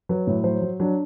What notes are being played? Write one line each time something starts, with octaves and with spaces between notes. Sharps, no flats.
F#3 B4
A2
F#3 C5
F#3
F#3 D4